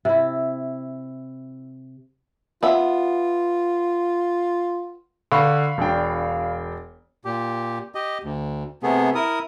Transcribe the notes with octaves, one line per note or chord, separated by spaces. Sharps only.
C3 E4
B3 F4 E5
D3 F5 B5 C#6
E1 D4 G5
A#2 G4
G4 D#5
D2
C3 A3 B3 G#4
E4 A#4 D#6